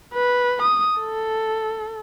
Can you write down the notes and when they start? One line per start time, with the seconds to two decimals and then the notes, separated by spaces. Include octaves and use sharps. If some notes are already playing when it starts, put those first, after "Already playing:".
0.14 B4
0.62 D#6
1.00 A4